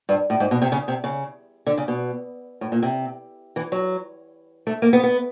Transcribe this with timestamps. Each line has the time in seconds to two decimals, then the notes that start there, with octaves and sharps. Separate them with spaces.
0.09 G2
0.30 A2
0.40 G#2
0.51 B2
0.62 C3
0.72 C#3
0.88 C3
1.04 C#3
1.66 D3
1.78 C#3
1.88 B2
2.61 A2
2.72 A#2
2.82 C3
3.56 E3
3.72 F#3
4.67 A3
4.82 A#3
4.93 B3
5.04 B3